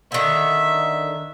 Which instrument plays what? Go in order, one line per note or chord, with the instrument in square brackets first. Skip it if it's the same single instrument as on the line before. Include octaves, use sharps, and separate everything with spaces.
[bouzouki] D3 D#3 [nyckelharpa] E5